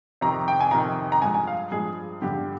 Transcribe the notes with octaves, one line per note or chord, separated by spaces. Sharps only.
F2 C3 D#3 A#5
G5
G#5
F2 C3 D#3 A#5
A#5
G2 F3 G#3 G#5
G#5
F5
G2 F3 G#3 G#4
G1 G2 D3 G4